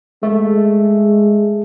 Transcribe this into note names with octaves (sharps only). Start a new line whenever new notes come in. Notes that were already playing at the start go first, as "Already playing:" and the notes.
G#3 A3